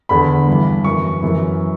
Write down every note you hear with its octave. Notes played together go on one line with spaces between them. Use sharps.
E2 D3 B5
G2 E3
F#2 E3 C#6
F#2 E3